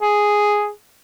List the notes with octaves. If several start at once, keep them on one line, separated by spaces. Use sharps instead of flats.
G#4